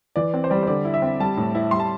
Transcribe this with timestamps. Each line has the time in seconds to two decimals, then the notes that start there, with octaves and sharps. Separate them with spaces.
0.16 E3 D5
0.34 C4
0.44 C5
0.50 G3 D5
0.63 C5
0.67 D3 D5
0.85 E4
0.94 E5
1.02 C4
1.20 G3 A5
1.37 A2
1.55 E4
1.71 G3 C6
1.80 A5